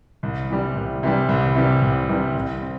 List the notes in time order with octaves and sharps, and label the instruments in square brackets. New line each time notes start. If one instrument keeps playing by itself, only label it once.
[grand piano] C2
C3 E3 G3
C2
C3 E3 G3
C2
C3 E3 G3
C2
C3 E3 G3
C2
C4